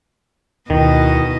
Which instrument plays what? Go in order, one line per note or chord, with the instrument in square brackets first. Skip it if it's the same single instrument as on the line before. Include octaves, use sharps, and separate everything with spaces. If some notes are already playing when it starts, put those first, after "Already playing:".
[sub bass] D2 [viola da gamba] B2 D#5 [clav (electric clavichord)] D#3 [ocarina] E4